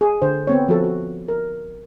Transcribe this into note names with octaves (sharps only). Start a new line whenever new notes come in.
G#4
D3 C5
B3 C4 C#5
F3 F#4 A4
F#4
A#4